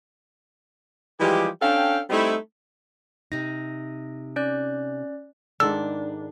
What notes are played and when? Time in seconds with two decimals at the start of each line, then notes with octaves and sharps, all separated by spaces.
1.20 E3 F3 G3 G#3 G4
1.61 C#4 D4 A4 F5 G5
2.10 G3 A3 C4 D#4 E4
3.32 C3 D#4 A#6
4.36 C#4 D5 F#6
5.60 G#2 D#3 D4 A4 E6